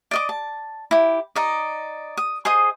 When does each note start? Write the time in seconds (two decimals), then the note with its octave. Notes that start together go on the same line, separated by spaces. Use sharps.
0.11 D5 D#5 D6
0.29 A5
0.91 E4 G4
1.36 D#4 D5 D#5
2.17 D#6
2.45 G#4 C5 D#5 D#6